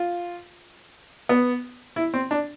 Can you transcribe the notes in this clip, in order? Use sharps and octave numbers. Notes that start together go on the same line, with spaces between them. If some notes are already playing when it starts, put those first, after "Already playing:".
Already playing: F4
B3
E4
C4
D4